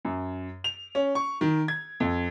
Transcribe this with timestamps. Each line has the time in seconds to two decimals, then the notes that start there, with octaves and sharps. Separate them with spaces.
0.05 F#2
0.64 F7
0.95 C#4
1.15 C#6
1.41 D#3
1.68 G#6
2.00 F2